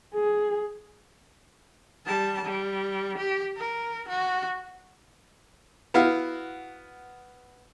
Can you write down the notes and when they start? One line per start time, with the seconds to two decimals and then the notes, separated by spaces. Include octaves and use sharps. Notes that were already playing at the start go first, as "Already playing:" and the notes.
0.15 G#4
2.06 G3 A5
2.45 G3
3.18 G4
3.57 A#4
4.09 F#4
5.94 B3 E4 F#4 F5